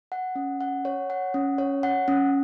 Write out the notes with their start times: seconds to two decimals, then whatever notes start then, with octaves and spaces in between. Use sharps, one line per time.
0.12 F#5
0.35 C#4
0.61 F#5
0.85 C#5
1.10 F#5
1.34 C#4
1.58 C#5
1.83 F#5
2.08 C#4